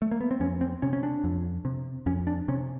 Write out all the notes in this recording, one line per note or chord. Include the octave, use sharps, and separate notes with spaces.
A3
A#3
B3
C4
F2 C#4
C4
C3 C#4
C#4
D4
F2
C3
F2 C#4
D4
C3 C#4